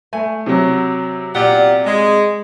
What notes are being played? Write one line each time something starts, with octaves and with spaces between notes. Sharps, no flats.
A3 G#5
C3 F#3
A#2 F4 G4 D5 F#5
G#3